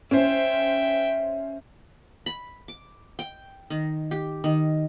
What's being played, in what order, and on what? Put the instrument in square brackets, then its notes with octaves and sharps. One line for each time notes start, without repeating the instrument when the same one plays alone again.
[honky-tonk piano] C#4 C5 [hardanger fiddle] E5 G5
[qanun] B5
D6
G5
D#3
G4
D#3